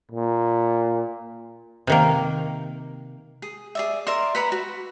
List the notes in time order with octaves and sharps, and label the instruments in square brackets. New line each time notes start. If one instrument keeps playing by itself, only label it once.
[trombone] A#2
[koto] C3 D#3 A#3
[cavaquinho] G#4
G#4 D5 E5
A#4 D5 E5 C6
B4 F#5 A#5 B5
F#4